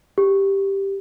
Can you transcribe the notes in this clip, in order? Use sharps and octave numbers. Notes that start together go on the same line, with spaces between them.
G4